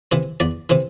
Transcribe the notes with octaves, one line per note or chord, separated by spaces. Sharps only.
C3 E3 C5
E2 D5
C3 E3 C5